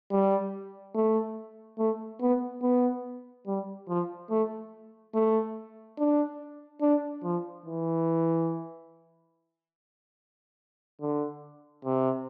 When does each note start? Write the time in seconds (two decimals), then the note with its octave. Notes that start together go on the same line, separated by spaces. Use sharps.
0.11 G3
0.95 A3
1.78 A3
2.20 B3
2.62 B3
3.47 G3
3.88 F3
4.30 A3
5.14 A3
5.98 D4
6.82 D4
7.24 F3
7.66 E3
11.01 D3
11.85 C3